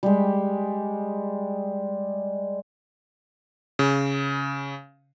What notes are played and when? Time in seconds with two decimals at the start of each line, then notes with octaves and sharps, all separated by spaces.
0.03 G3 G#3
3.79 C#3